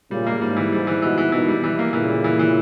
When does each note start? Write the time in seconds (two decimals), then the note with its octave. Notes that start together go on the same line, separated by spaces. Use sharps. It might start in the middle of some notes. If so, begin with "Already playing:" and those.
0.11 A#2 C#3 G3
0.27 A#3
0.41 G#2 G3
0.56 E3
0.72 G#2 G3
0.87 E3
1.02 G#2 B2 E3
1.18 E3
1.32 B2 D#3 E3
1.48 G3
1.64 E3
1.79 A#3
1.93 A#2 C#3 E3
2.08 G3
2.24 E3
2.39 E3